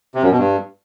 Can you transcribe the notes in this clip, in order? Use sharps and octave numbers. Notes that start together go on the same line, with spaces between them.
C3
F#2
B2
G2